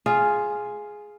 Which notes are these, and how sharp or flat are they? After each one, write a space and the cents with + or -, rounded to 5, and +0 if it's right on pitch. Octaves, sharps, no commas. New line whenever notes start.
F4 +0 G#4 +5